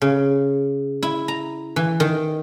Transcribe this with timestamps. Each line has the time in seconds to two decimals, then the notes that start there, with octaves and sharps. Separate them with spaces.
0.02 C#3
1.03 E4
1.28 A#5
1.76 E3
2.00 D#3